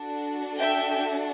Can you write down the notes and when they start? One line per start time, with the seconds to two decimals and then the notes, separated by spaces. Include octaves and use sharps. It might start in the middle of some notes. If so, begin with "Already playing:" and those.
Already playing: D4 F#4 A4
0.59 E5 G5